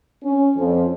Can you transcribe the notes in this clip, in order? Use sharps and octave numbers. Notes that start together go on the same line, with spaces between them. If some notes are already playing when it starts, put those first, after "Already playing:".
C#4
F2